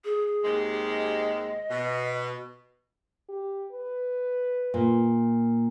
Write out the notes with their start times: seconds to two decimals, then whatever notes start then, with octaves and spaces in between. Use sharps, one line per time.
0.05 G#4
0.44 D#2 C3 G#3
0.88 D#5
1.71 B2
3.29 G4
3.71 B4
4.74 A#2